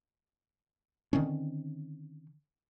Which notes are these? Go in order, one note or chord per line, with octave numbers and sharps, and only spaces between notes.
D3 D#3 C4 C#4